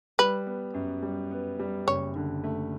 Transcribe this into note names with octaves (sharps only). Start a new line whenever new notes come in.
G3 B4
B3
F#2
G3
B3
G3
F#1 C#5
D3
A3